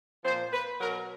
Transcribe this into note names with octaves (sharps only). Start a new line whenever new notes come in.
A#2 F3 C5
B4
B2 F#3 A#4